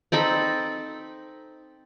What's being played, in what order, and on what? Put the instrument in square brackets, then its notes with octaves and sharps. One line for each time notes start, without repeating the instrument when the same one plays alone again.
[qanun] C4 D#4 A4 B5